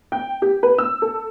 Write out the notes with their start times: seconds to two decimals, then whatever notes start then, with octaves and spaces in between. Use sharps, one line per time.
0.12 G5
0.42 G4
0.63 B4
0.78 E6
1.02 A4